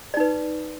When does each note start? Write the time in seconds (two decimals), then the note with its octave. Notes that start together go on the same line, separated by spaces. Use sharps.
0.14 D5
0.17 D#4
0.20 B4